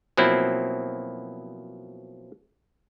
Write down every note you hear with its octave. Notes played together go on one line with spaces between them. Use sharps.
B2 F3 F#3 A#3 C4 E4